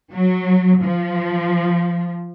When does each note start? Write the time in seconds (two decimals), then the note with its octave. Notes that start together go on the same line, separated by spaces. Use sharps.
0.13 F#3
0.83 F3